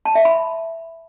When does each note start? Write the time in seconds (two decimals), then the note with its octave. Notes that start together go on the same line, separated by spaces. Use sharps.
0.05 A5
0.15 E5
0.25 B5